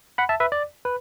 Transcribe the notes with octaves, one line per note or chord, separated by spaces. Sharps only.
F#5 B5
E5 A5
B4 E5
D5
B4